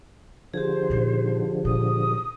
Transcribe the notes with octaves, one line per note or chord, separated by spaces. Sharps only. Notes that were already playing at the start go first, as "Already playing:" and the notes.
D3 F3 G4 G#4 C5
A#2 D#3
A#2 D#6